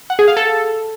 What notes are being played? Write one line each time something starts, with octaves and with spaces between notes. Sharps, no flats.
F#5
G#4
F5
A4